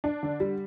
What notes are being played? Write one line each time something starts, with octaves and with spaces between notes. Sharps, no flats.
D4
D3
G3